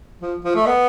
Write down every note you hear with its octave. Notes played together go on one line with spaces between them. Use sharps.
F3
F3
A3
B3